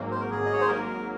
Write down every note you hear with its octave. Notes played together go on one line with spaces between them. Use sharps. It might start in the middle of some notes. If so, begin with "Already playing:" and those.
Already playing: G#1 G#2 F#3 A#3
C5
A#4
G#1 G#4
D#5
C#5
C5
G#2 F#3 A#3 A#4